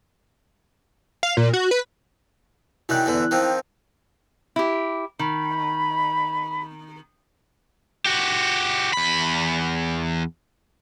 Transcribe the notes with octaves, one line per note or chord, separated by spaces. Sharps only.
F5
A#2
F#4
B4
F#2 D#3 G3 E4 F#6
E2 D3 E3
D#3 F3 C4
E4 G4
D#3 B5
F#4 G4
E2 B5